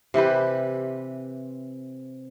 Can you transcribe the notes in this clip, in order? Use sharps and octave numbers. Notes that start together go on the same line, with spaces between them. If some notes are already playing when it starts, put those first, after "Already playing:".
C3 E3 G4 B4